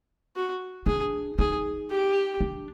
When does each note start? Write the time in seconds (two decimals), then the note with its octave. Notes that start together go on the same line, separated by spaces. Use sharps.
0.36 F#4
0.86 D4 G#4
1.39 D#4 G#4
1.90 G4
2.41 D4